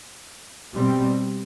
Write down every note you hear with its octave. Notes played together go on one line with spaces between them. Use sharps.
B2 G3 C4